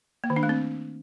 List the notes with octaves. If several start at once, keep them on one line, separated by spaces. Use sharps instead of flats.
A#3
D#3
D4
A3
C4